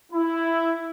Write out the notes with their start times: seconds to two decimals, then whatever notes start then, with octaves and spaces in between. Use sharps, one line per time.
0.12 E4